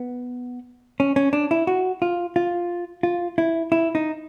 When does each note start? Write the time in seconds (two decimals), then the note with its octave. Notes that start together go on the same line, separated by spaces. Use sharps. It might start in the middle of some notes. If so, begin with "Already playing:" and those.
Already playing: B3
1.00 C#4
1.16 C#4
1.33 D4
1.51 E4
1.67 F#4
2.02 F4
2.36 F4
3.03 F4
3.38 E4
3.72 E4
3.95 D#4